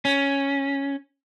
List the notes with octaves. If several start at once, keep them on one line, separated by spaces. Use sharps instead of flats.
C#4